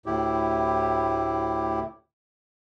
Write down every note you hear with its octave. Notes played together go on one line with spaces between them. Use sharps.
D2 A2 E4 G4